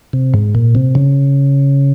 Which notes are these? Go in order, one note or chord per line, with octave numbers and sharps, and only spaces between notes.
C3
G#2
A#2
C3
C#3